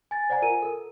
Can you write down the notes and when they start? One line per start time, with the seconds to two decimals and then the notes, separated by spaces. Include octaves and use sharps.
0.11 G#5 A6
0.29 C5 D5 F#5 G#5 A#5
0.42 F4 A#4 G#5 D#7
0.62 A4 A#4